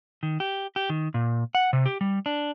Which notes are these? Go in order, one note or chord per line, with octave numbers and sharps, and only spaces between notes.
D#3
G4
G4
D#3
A#2
F#5
C3
G4
G3
D4